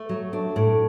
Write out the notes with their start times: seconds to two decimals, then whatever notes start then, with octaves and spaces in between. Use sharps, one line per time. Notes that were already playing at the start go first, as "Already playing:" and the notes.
Already playing: A3
0.09 F#3
0.33 D4
0.56 A2